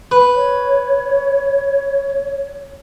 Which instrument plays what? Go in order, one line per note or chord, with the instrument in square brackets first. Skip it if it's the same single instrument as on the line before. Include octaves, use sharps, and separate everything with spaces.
[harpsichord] B4
[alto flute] C#5